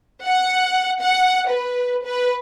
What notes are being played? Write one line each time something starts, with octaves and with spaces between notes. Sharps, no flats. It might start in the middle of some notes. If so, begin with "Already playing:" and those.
F#5
F#5
B4
B4